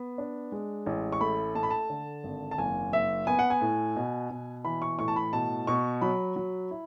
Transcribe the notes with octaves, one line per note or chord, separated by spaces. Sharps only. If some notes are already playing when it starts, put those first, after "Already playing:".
Already playing: B3
D4
G#3
A1
C#6
A3 B5
A3 A5
B5
A5
D3
G#1
A5
F#1 G#5
F#1 E5
B3 G#5
F#5
G#5
A2
B2
B2
E3 B5
C#6
A2 C#6
A5
B5
B2 A5
B2 C#6
F#3 B5
F#3
E4